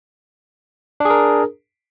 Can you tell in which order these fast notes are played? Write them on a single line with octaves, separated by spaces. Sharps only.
D4 G#4 A#4